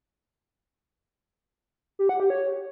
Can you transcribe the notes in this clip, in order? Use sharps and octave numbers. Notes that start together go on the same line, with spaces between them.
G4
F#5
G4
C#5